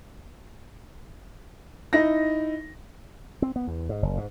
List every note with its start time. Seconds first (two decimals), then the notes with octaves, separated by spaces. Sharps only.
1.93 D#4 E4 A#6
3.42 C4
3.56 B3
3.67 E2
3.89 G#2
4.03 F#1
4.17 G#2